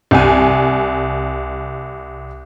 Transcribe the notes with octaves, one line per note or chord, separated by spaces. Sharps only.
C2 G#5